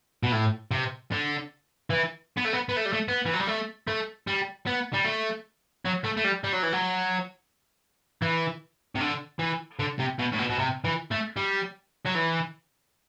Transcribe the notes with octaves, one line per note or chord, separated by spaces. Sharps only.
B2
A2
C3
D3
E3
B3
A3
B3
B3
A3
G3
A3
B3
E3
F#3
G3
A3
A3
G3
B3
G3
A3
F#3
A3
A3
G3
G3
F#3
E3
F#3
E3
C3
D3
E3
D3
C3
B2
A2
B2
B2
C3
E3
A3
G3
F#3
E3